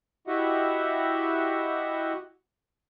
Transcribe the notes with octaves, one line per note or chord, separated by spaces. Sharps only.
E4 F#4 G4 D#5 E5 F#5